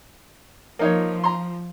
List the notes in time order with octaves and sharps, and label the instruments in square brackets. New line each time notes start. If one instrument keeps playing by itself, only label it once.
[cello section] F3 [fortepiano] A#3 D#4 C#5
[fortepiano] A#5 C6